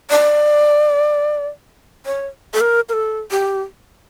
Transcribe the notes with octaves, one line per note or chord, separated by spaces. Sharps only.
D5
C#5
A4
A#4
A#4
A4
G4